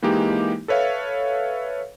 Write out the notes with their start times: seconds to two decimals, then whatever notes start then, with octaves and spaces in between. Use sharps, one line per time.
0.02 E3 G#3 A#3 D#4 G4
0.68 A4 B4 C#5 E5 F5